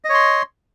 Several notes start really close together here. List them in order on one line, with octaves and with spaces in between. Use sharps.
D#5 C#5 C6